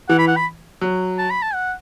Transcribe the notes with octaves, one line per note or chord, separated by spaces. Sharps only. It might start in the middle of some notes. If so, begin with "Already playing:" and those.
E3 F#5
B5
F#5
B5
F#3
A5
B5
A5
F#5